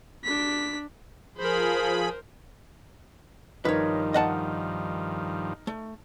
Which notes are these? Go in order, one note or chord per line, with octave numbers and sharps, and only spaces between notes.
D4 B6
F3 G#4 A#4 C5 B5
G2 D#3 F3 D#4 A#4 B4 C#5
D#5 F#5 A5
A3